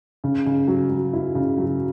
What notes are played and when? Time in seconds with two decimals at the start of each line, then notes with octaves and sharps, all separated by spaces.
0.24 C#3
0.46 C#3
0.68 F#3
0.90 F#3
1.13 E4
1.35 C#3
1.58 F#3